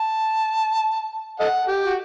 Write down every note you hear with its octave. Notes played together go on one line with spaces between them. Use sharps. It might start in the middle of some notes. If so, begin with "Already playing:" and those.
Already playing: A5
A4 D#5 F#5
G4
F#4